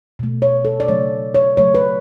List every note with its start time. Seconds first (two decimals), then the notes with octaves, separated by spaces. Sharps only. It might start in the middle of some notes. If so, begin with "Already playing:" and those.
0.19 B2 A3
0.42 C#5
0.65 A4
0.80 D5
0.88 C#3 F#3 A3 C#5
1.34 C#5
1.57 C#3 F#3 A3 C#5
1.75 B4